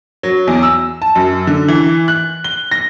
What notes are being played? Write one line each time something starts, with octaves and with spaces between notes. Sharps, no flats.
F#3
E2
E6
A5
F#2
D3
E3
F#6
G7
A#6